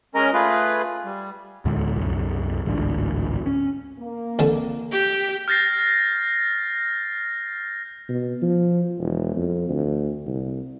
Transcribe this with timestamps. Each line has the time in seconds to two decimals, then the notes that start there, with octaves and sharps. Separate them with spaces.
0.15 G#3 C#4 A#4 D#5 A#5
0.33 A3 F4 G#4 B4
1.05 G3
1.65 D2 A2 D3 G#3
1.96 C2 F#2
2.65 A1 D2 G#2 D3
3.47 C#4
4.00 A#3
4.39 C2 D3
4.92 G4 G5
5.48 F6 G6 A6 A#6 C7
8.09 B2
8.42 F3
8.99 E1
9.36 F2
9.69 D2
10.27 C2